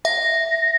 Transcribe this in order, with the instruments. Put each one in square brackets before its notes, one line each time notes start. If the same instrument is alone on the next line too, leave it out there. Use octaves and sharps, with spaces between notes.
[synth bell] E5 [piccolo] A#6